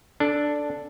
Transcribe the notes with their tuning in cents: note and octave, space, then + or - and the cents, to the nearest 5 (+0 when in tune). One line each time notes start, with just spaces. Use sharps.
D4 +0 A4 +0